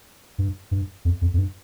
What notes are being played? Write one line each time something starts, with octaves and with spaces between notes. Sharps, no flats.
G2
G2
F2
F2
F2
G2